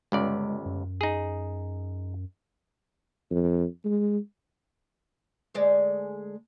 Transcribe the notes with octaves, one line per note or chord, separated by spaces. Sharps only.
G1 C#2 G#3 D5
F#2
D#4 G#4
F2
G#3
D2 G#3 D5